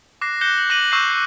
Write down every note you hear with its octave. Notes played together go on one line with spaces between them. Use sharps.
D6 F#6 A#6 C7
D6 F#6 G6 A#6 C#7 G7
F#7
D6 A#6 D#7 F#7
C#6 D6 E6 F#6 G6 C7
G6